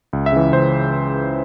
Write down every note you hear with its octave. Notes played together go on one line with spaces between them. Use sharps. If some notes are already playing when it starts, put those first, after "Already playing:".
C#2
E5
C#3 E3
C#2 C5